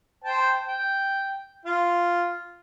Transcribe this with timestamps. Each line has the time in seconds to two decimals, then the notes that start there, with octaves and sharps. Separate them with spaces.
0.24 C5 G5 A5
0.66 G5
1.65 F4